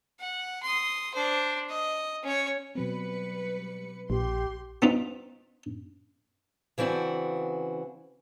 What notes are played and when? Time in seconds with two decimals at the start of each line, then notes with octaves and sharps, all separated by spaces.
0.20 F#5
0.63 C6 D#6
1.14 D4 C5
1.70 D#5
2.23 C#4 C#5
2.75 B2 F#3 G3 C4 B4 C#7
4.10 A#1 G4 C6
4.82 B3 C4 D#4 F4
6.78 C#3 E3 C4 D4 F#4